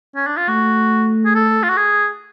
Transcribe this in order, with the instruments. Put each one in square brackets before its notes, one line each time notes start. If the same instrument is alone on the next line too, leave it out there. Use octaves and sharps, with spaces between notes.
[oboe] C#4
D4
F4
[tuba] A3 [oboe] F#4
[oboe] G#4
A4
F4
F#4
G#4